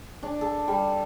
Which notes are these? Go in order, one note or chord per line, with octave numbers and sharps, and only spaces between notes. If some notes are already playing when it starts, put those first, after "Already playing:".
D4
A4
G3